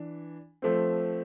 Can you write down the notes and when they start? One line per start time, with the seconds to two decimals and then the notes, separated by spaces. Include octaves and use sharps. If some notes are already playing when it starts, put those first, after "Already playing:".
Already playing: E3 D4
0.62 F3 A3 C4